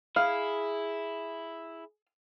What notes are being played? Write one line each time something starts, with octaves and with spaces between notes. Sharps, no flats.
E4 G#4 F5